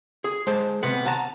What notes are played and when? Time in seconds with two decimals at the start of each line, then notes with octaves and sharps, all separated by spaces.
0.24 G#4
0.47 G#3 C5 A5
0.83 C3 B3 F#5
1.05 F#5 A5 A#5